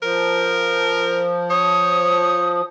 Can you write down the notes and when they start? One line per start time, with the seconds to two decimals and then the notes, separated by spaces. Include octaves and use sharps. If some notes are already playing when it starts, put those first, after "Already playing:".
0.02 F3 A#4
1.50 C#5 D#6